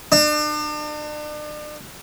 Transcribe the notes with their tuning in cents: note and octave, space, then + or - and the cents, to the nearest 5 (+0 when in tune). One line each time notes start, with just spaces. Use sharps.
D4 +40